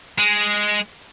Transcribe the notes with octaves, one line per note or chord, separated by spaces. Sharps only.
G#3